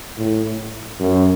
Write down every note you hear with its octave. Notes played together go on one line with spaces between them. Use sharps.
A2
F#2